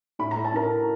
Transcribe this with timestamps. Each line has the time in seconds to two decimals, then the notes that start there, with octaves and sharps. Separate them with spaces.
0.19 A2 B5
0.31 A3 A#5
0.44 A5
0.53 A2 A#4 A#5